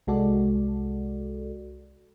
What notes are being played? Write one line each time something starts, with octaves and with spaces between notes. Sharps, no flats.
C2 G#3 F#4 A4 D5